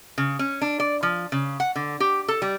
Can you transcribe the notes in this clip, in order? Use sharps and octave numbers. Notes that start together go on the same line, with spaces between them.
C#3
C#4
D4
D5
F3
C#3
F#5
D3
G4
A4
G3